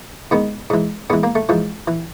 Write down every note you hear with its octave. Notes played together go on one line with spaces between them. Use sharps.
G#2 D#3 B3
G#2 E3
G#2 E3 B3
A#3
A3
G#2 E3 F3
E3